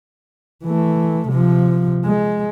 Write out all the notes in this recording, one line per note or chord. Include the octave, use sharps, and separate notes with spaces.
E3 A3
C3 F3
G#3